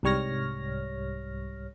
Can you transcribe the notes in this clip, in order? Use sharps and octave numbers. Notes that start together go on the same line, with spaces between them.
C2 G#2 G3 C#5 F6 A#6